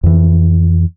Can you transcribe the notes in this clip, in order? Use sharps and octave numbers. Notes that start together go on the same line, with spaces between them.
F2 E3